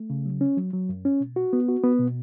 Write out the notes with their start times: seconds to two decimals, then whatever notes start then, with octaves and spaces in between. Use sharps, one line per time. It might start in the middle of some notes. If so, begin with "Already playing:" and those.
Already playing: A3
0.10 C#3
0.26 F#3
0.41 C#4
0.57 F#3
0.73 F#3
0.89 F#2
1.05 C#4
1.20 B2
1.36 F#4
1.53 B3
1.68 F#4
1.84 B3
1.99 B2